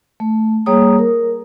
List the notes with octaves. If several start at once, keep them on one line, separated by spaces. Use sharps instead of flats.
A3
G3 A#3 G#4 C#5 A#5 D#6
A#4